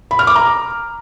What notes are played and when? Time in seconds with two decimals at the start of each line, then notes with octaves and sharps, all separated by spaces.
0.11 B5
0.19 F6
0.27 D6
0.35 A#5